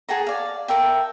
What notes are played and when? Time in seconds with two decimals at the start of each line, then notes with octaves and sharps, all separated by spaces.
0.09 G#4 F#5 A5 A#5
0.27 D5 F5
0.68 A4 A#4 E5 G5